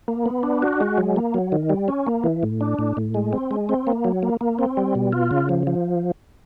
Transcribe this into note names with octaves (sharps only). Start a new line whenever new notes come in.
A#3
B3
D4
F#4
G#3
F#3
A#3
F#3
D#3
G3
C#4
A#3
E3
A2
D4
A2
A2
G#3
C4
G#3
C4
A#3
F#3
A#3
A#3
C4
G3
B2
F4
C#3
F3
F3